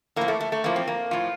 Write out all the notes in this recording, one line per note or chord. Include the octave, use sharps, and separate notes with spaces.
A2 F3 A#3
A3
A3
A3
A2 F3 A#3
C4
A#3
A2 F3 F4